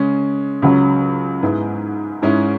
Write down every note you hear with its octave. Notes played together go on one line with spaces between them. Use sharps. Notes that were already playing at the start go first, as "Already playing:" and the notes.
Already playing: C#3 G#3 C#4
C#2 C#3 F#3 C#4
G#2 G#3 B3 E4
G#2 G#3 C#4 E4